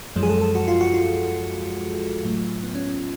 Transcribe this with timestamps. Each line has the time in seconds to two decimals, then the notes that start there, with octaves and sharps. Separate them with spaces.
0.16 F#2 F3 G#3
0.23 G#4
0.29 A4
0.41 A4
0.55 F#4
0.68 F4
0.81 F#4
0.94 F4
2.23 A2 F#3 A3
2.64 B3
2.75 C#4